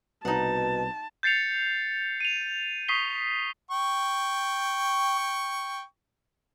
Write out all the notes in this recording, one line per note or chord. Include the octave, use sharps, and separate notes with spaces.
C2 B2 D#4 F#5 A5
G6 A6 C7 C#7 F7
D#7 F7
C#6 D#6 B6 C7 G7
G5 C#6